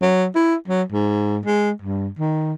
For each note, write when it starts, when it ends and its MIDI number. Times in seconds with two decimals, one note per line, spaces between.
0.02 0.27 54
0.35 0.55 64
0.68 0.83 54
0.92 1.39 44
1.46 1.71 56
1.82 2.09 43
2.19 2.53 51